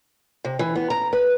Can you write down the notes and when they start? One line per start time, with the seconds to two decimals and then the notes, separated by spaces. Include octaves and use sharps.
0.45 C3
0.59 E3
0.75 B3
0.90 A#5
1.13 B4